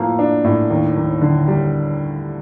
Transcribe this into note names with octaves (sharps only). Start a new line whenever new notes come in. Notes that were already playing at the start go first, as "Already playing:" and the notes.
Already playing: A2 F3 A#3
D4
A2
D#2
D#2
D3
G3